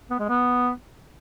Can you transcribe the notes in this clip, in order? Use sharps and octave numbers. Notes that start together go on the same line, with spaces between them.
B3
G#3
B3